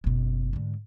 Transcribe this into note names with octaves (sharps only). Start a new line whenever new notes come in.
F#1 B2
G#2 D3